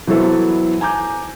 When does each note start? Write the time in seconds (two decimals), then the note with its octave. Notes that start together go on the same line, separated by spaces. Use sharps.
0.07 E3 F#3 B3 E4 A4 C5
0.81 G#5 A#5 D6 G6